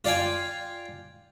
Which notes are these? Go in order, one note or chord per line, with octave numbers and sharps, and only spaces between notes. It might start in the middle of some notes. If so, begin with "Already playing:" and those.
F4 D5 F5 G5 G#5